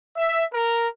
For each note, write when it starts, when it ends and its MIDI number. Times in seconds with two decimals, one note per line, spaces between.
0.15 0.42 76
0.52 0.87 70